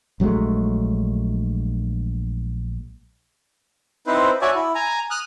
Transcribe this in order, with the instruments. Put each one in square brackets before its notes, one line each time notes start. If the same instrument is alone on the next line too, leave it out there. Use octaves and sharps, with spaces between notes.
[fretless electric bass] A#1 F#3 G#3 A3
[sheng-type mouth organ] C4 D#4 E4 B4 C5
F#4 C#5 D5 E5 G#5 A5
E4
G#5 A#5
D#6 F6 F#6